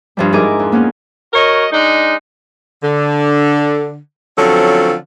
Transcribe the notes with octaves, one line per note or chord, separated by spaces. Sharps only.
G2 F3 G3
G#2 D#4 E4 G#4 A#4 D6
F2
A#3 B3 C#4
F#4 A#4 C#5 D#5
G#3 D4 D#4
D3
D3 F3 F#3 C4 C#4 A4